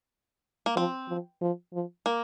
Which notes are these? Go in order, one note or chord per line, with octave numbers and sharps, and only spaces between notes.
A#3
F3 C4
F3
F3
F3
A#3